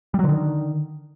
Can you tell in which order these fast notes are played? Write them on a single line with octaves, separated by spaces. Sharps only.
G3 F#3 D3 D#3